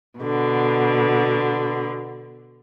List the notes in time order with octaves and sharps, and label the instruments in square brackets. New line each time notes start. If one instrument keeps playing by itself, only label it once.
[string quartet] B2 D3